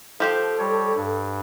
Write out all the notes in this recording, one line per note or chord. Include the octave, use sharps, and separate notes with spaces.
F3 G4 A4 C5
G3 C#5
G2